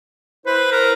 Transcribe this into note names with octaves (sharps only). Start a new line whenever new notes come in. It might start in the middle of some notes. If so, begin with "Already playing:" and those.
E4 B4 C5
A#4